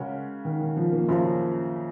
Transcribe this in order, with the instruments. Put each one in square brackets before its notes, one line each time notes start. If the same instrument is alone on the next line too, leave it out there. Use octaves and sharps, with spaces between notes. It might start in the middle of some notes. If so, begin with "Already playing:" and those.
Already playing: [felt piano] C#3 G#3 C#4 F#4 A#4
[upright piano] D#3
D#3
F3
A#3
[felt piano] F#2 C#3 F3